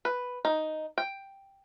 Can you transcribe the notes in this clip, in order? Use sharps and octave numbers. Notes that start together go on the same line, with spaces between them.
B4
D#4
G5